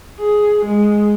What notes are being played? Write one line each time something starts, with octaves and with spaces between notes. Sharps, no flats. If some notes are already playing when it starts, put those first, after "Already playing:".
G#4
G#3